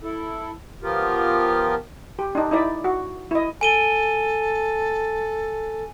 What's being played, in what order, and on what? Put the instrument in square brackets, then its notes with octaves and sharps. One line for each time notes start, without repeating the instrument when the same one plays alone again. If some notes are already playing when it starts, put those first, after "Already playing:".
[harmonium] E4 A4
F3 B3 F4 G4 A#4
[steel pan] G4
D4 D#4
D#4 E4 D5 E5
F#4
E4 D#5
[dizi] A4 [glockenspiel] G#5 D#7 G7